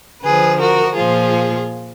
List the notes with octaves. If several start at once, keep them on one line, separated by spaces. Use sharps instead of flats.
D3 F3 G#4 B4
F#4 A#4
A#2 F3 F4 G#4